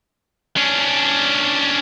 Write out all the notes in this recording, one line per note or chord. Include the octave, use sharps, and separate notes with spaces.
C#4 D4